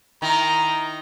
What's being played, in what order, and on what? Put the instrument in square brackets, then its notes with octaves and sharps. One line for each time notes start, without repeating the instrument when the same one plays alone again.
[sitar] D#3 E4 [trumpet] A#5